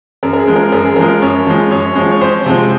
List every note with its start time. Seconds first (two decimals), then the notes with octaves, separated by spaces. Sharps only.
0.23 F#2 A#4
0.33 A#4
0.39 G#4
0.48 F3 G#3
0.56 A#4
0.72 F#2 A#4
0.84 G#4
0.96 F3 G#3 A#4
1.22 F#2 C#5
1.46 F3 G#3
1.71 F#2 C#5
1.96 F3 G#3
2.11 C#5
2.21 F2 C5
2.46 C3 F3 G#3